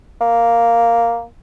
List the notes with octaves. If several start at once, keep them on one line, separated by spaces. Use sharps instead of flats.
A#3